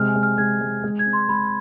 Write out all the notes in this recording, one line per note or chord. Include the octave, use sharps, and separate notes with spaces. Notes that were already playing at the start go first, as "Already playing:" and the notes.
Already playing: C3 G#3 F6
G#5
G#3
F6
G#3 G#6
G#3
G#3
G#6
C4
C6
G#3 B5